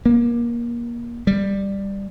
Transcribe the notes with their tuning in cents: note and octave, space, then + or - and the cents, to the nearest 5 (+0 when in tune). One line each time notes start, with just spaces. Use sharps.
A#3 +25
G3 +10